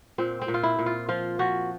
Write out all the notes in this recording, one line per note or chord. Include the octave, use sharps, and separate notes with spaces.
A#2 C4
C4
A#2
F4
E4
A#2
F4
F3 F4
F3 F#4